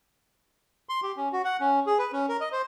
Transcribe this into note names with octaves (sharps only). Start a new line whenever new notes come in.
C6
G4
C#4
F#4
F#5
C#4
G#4
B4
C#4
A#4
D#5
C5